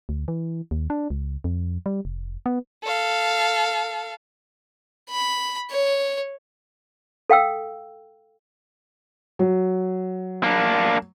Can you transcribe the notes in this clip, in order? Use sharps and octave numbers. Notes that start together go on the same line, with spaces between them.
D2
E3
D#2
D4
C#2
F2
G3
F1
B3
A4 F5
B5
C#5
A4 F5 G5 E6
F#3
A#3 D4